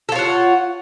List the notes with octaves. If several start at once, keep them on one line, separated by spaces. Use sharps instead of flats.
F4 A4 C#5 F#5